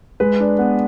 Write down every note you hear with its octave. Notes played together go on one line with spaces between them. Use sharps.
G#3 B4
D4
B3